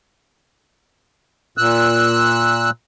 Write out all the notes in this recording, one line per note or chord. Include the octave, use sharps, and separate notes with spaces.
A#2 E6 F#6